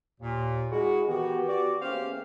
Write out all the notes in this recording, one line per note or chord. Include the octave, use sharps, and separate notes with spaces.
D#2 A#2
G#3 E4 F#4 G#4
D#3 E3 B3 F#4 G4
F#4 D5
E2 A#3 C#4 G4 C5 F5